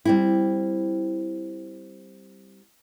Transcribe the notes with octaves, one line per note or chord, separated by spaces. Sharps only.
G3 C4 E4